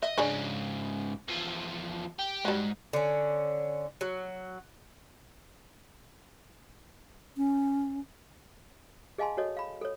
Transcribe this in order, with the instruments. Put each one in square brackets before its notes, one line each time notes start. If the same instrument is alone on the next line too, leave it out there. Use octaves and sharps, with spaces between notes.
[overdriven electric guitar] D#5 [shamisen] E5
[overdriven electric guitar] G#2 C#3 [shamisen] D4 G#4 C#5
[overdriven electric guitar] E2 F3
G4
[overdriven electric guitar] G#2 [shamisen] F#3 G3
[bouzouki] D3 C#4
F#3
[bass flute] C#4
[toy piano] G#4 D#5 F5 G#5 A5 C6
F#4 A4 C#5 D#5
F5 B5
A4 C#5